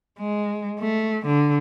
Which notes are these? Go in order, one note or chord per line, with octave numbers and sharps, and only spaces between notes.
G#3
A3
D3